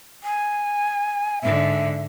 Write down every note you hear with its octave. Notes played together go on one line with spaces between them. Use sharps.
G#5
G#2 D3 E5